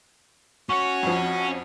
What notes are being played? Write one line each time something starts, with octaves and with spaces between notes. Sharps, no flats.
C#4 F#4 C#5 C#6
F2 F3